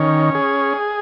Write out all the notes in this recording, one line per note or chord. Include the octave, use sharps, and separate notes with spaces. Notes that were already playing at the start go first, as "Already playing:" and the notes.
Already playing: D#3 C#4
G#4